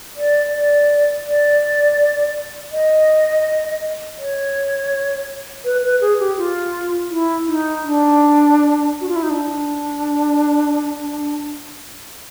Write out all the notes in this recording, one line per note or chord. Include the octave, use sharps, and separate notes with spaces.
D5
D5
D5
D#5
C#5
B4
B4
G#4
G4
F4
E4
D#4
D4
F#4
F4
E4
D#4
D4